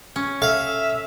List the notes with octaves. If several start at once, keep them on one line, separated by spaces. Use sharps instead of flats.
C#4
A4 E5 F5